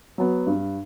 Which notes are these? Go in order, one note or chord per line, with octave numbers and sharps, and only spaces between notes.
F#3 B3
G2